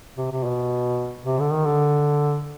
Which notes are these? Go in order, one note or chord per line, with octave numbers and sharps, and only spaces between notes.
C3
C3
B2
C3
D3
D#3
D3